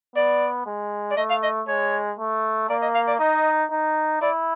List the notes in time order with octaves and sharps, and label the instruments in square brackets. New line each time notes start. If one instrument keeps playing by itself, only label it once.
[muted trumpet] B3 [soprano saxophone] D5
[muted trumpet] G#3
[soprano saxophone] D5
[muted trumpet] A3 [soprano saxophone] D#5
[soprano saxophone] F5
D#5
[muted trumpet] G#3 [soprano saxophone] C#5
[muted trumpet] A3
[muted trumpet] A#3 [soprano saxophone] D5
[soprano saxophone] D#5
F5
D5
[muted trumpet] D#4 [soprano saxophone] D#5
[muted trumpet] D#4
[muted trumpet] E4 [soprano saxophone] D5